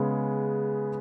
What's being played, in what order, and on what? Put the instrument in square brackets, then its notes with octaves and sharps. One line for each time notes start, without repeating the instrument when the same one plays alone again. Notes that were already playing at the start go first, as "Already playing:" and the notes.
Already playing: [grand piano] C#3 G#3 B3